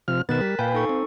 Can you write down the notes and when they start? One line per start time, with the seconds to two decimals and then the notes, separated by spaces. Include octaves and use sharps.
0.08 C3 F3 F6
0.29 B2 D#3 B3 A#4 F#6 A6
0.41 G3 B6
0.59 A#2 B4 F5 G5 G#5
0.74 D#4 A4 C#6
0.89 C4